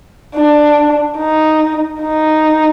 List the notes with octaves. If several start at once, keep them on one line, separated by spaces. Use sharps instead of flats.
D4
D#4
D#4